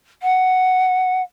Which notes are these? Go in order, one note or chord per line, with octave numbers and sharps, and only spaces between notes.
F#5